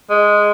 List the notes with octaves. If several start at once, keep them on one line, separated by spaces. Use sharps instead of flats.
G#3